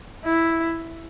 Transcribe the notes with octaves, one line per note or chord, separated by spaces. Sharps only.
E4